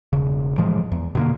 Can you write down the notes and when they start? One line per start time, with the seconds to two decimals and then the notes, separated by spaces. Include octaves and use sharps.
0.13 E1 C#3
0.58 A2 E3 F3 G#3
0.92 E2
1.15 B2 D3 A#3